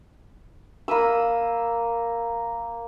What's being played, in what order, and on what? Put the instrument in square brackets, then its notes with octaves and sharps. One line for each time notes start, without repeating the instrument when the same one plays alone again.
[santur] A#3 B5 D#6 E6